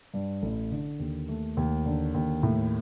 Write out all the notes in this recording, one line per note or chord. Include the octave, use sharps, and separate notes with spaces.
G2
A1
D3
D#2
A3
D#2
D3
D#2
A2